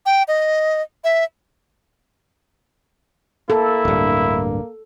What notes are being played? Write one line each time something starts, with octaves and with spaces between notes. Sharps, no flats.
G5
D#5
E5
A#3 E4 A4
D1 G2